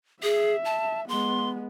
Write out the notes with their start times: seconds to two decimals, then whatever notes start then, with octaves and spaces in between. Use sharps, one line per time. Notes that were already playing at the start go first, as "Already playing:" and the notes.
0.23 G#4 E5
0.65 A5
1.09 G#3 B3 C6